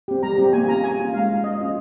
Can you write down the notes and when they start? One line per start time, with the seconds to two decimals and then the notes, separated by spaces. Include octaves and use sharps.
0.08 C4 G4
0.23 G3 A#5
0.38 C4 G4
0.53 A#3 G#5
0.64 G#5
0.68 C#4 F4 A#5
0.83 A#3 G#5
0.99 C#4 F4
1.13 G#3 F5
1.29 C#4 F4
1.44 G#3 D#5
1.59 C#4 F4